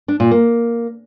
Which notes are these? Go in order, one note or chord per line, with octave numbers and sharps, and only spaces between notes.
D4
A#2
A#3